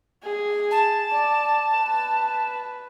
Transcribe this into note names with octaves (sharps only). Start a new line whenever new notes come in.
G#4
A5
D5
B4